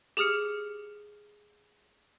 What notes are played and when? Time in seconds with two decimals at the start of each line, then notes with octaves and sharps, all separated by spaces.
0.17 G4 G#4 D#6 F6 C#7